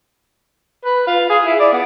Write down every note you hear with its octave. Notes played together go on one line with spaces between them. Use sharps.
B4
F4
G#4
E4
D5
B3